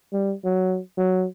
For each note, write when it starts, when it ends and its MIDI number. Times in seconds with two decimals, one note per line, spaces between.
0.13 0.35 55
0.44 0.80 54
0.97 1.26 54